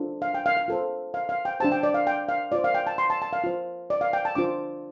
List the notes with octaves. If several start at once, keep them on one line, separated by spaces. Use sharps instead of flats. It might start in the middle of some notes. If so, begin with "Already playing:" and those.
Already playing: D4 F4 A4 C5
F5
G5
F5
F5
F4 A4 C5
F5
F5
G5
D4 G4 C5 A5
G5
D5
F5
G5
F5
F4 C5 D5
F5
G5
A5
C6
A5
A5
F5
F4 C5
D5
F5
G5
A5
D4 F4 C5 D6